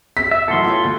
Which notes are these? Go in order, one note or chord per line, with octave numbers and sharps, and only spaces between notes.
E6 B6
E5
A1 F#2 E3 A4 C6
F4 G4 C#5
D2